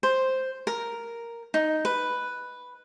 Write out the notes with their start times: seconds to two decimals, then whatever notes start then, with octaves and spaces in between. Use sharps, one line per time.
0.03 C5
0.67 A#4
1.54 D#4
1.85 B4